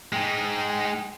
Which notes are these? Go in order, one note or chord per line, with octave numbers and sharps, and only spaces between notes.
G#3 D#4 G5